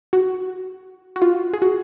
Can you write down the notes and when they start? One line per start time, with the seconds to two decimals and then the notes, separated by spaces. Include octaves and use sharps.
0.13 F#4
1.16 F#4
1.22 F4
1.53 G#4
1.62 F#4